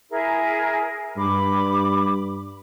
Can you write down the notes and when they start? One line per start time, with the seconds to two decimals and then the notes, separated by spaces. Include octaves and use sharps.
0.10 E4 G#4 A#4
1.17 G2 B5 D6